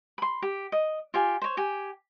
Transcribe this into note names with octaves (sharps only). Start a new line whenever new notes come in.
B5 C6
G4
D#5
F4 G4 G#5
C5 C#5
G4 G#5